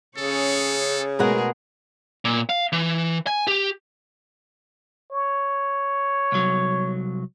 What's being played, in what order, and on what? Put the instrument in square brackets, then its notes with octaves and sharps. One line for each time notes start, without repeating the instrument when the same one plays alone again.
[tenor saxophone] C#3 [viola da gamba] C#4 G#4 C#5 [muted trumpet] A4
[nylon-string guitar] B2 G#3 F#5 [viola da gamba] A3 G#4 A#4
[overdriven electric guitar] A#2
F5
E3
G#5
G4
[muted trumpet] C#5
[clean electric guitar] C2 F#3